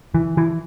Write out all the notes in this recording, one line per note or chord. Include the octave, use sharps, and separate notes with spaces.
E3
E3